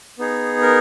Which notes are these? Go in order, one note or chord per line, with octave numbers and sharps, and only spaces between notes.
B3 D#4 G#4
A#4